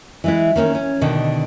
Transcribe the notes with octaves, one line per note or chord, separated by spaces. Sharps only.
E3 G#3 E4
D#3 A#3 C4 C#4
C#4
B2 D3 D#3